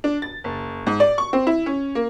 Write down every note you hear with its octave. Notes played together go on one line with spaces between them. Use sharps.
D4
A6
F#1
G#2
D5
C#6
C4
E4
C#4
A#3